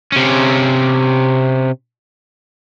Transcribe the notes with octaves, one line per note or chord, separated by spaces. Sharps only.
C3 C#4